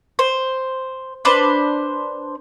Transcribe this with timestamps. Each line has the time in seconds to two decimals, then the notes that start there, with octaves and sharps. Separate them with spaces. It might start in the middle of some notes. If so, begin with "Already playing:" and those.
0.19 C5
1.25 D4 B4 C5